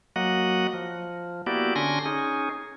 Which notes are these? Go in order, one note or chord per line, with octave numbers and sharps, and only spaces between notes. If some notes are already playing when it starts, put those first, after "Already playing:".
F#3 A#3 F#4 D#5 F#5
F3
A#3 B3 E4 F#4 G4 D5
D3 C#4 D4 G#5 C6 A#6
C#4 D#4 G#4